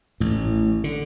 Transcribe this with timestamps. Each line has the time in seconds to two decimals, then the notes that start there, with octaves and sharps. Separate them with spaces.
0.20 A1 A2
0.84 D3